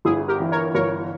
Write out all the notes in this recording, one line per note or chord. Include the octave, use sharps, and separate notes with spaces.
G1 E4 G#4
G4 A#4
E3
A#4 C#5
G1 A#4 C#5